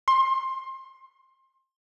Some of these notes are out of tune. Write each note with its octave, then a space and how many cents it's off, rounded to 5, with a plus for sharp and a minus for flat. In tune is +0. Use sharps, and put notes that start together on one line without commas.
C6 +25